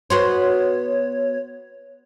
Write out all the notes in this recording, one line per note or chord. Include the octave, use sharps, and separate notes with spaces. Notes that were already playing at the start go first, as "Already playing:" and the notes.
B3 F#4 C5 C#5